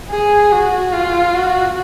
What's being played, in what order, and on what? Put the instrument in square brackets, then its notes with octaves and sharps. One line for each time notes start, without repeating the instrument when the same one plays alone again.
[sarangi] G#4
F#4
F4
F#4